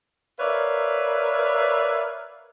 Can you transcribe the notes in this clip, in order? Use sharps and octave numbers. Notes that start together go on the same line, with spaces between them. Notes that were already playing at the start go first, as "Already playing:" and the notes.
A#4 B4 C#5 D5 E5 F5